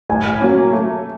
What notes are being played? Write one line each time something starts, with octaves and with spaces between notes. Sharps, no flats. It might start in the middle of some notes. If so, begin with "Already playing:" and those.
A2 G#5
F#3 A#3 C#4
A3